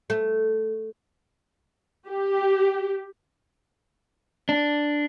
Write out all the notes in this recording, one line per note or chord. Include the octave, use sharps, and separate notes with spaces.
A3
G4
D4